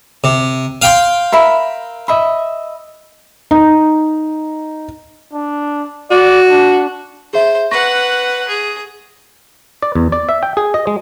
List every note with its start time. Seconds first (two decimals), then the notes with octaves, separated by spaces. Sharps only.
0.24 C3
0.82 F5 G5 C6
1.32 A#4 E5 B5
2.08 D#5 E5 B5
3.51 D#4
5.33 D4
6.11 F#4 D5
6.51 D4
7.33 G#4 C5 E5
7.71 B4 F#5 C#6 A#6
8.48 G#4
9.82 D5
9.95 E2
10.12 D5
10.29 E5
10.43 G5
10.57 G#4
10.74 D#5
10.87 G#3